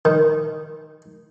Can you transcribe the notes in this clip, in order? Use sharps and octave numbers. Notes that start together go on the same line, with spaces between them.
D#3